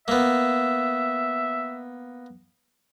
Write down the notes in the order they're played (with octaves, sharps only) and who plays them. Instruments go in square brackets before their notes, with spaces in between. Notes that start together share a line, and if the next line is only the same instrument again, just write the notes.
[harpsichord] A#3 B3 [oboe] E5